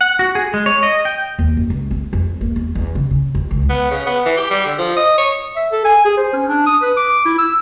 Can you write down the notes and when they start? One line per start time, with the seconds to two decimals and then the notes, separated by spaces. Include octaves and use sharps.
0.01 F#5
0.19 F#4
0.35 G#4
0.54 G#3
0.66 C#5
0.83 D#5
1.05 G5
1.39 D#2
1.57 F#2
1.70 C#2
1.91 C4
2.13 F2
2.41 A#3
2.56 E2
2.75 E2
2.95 C#3
3.11 C#3
3.35 F2
3.51 C#2
3.70 B3
3.90 C#3
4.06 B3
4.26 E3
4.37 G4
4.50 G3
4.65 D3
4.78 F3
4.97 D#5
5.18 C#5
5.56 E5
5.72 A4
5.85 G#5
6.05 G#4
6.17 C5
6.33 C#4
6.48 D4
6.66 D#6
6.82 B4
6.97 D6
7.25 E4
7.39 E6